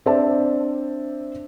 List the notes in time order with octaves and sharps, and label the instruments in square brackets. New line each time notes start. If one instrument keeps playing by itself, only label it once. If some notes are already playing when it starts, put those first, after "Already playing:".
[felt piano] C4 D4 C5 D5 E5 A5